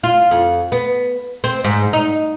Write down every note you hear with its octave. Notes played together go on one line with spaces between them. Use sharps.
F4
F2
B3
C4
G#2
D#4